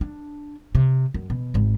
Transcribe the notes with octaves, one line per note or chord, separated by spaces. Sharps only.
D4
C3
F#2
B2
G#1 G#2